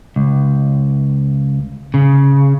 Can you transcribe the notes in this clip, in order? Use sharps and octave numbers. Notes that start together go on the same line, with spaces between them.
C#2
C#3